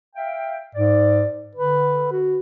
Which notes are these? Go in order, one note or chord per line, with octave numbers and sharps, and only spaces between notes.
E5 F5 G5
G#2 D5
D3 B4
F#4